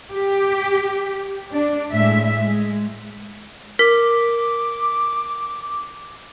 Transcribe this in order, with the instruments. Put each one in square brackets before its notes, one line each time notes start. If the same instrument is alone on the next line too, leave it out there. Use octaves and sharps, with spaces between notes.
[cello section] G4
D4
A2 G#3 E5
G#3
[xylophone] A#4 B6 [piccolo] D6